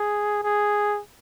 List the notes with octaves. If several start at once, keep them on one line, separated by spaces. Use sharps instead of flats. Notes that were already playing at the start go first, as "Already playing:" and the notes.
Already playing: G#4
G#4